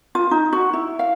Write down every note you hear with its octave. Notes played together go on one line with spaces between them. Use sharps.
F4
D#4
F#4
E4
F5